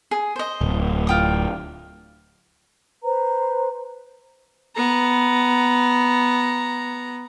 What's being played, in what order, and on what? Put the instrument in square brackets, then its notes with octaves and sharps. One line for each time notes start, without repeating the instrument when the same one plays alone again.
[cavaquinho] G#4
C5 D#5
[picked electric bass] D1
[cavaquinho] F4 G5 D#6
[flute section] B4 C5 A#5
[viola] B3 A#5